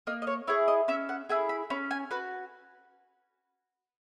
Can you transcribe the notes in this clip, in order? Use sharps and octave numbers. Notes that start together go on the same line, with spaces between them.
A#3 D#5
D#5
C#5
E4 G#4 C#5
D#5
C#4 E5
F#5
E4 G#4 G#5
B5
C#4 B5
G#5
F#4 B4